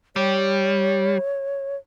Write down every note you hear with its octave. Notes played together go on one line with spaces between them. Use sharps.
G3 C#5